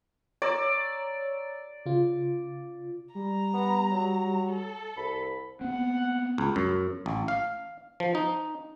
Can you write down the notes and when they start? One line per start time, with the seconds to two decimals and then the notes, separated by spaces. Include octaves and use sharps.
0.42 C#5 D5 A#5 E6
1.86 C#3 F4
3.15 G3 A#5
3.54 B3
3.91 F#3
4.50 A4
4.97 C2 B5
5.61 B3 C4 F#5
6.38 C#2
6.56 F#2
7.06 A1
7.28 F5
8.00 F3
8.15 D#4